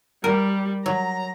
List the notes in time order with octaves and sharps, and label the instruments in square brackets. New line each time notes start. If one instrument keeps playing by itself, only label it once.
[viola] G3 [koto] A#4
[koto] F#3 [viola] A#5